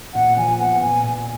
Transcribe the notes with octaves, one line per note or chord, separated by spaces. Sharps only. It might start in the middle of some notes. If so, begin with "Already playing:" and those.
A#2 F#5
F3 G#5
B3 F#5
A#2 G#5
A#2